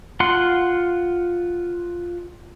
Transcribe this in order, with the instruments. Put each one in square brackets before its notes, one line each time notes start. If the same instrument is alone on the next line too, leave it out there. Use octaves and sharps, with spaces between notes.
[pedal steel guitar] F4 F#5 C6